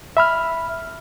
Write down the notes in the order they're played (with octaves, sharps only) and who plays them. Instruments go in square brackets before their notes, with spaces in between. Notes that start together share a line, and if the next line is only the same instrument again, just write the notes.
[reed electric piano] E5 B5 F6